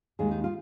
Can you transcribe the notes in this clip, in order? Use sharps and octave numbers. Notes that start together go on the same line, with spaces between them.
D#2 D#3 G#3 G#4
D#4
F4